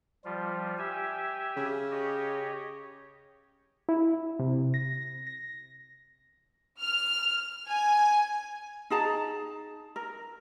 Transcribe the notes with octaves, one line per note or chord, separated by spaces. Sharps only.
F3 G3 F4
G4 E5 G#5
C#3
G4 C#5 D#5
E4
C3
A#6
A#6
F6
G#5
D#4 G#4 A5 A#5
A#4